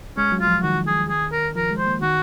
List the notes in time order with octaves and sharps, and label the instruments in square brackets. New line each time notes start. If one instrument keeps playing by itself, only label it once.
[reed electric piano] G#3 [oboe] C#4
[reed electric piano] F#3
[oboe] F4
[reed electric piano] F3
[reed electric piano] D#3 [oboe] F#4
[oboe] G#4
G#4
A#4
[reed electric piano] F3 [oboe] A#4
[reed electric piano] G#3
[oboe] C5
[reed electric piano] A#3
[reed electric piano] D#3 [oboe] F#4